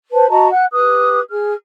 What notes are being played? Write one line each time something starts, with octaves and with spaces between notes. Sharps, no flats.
B4 C5 A5
F#4 D#5 A5 A#5
F#5 F#6
G4 B4 D#6 F#6
G#4 F6